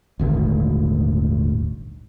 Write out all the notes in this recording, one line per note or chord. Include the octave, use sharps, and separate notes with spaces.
D#1 G#1 D2